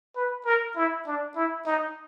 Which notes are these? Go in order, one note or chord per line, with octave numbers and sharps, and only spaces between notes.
B4
A#4
E4
D4
E4
D#4